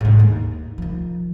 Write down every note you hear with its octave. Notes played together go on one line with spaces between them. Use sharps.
G#2 D3
D#2
D#3 F3